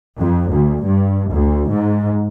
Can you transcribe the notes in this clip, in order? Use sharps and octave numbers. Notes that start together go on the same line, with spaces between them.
F2
D2
G2
D2
G#2